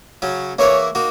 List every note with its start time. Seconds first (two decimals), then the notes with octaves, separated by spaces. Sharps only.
0.22 C#3 F#3 C#4
0.59 E3 A#3 E4 G#4 B4 C#5
0.95 A#3 D#4 F#4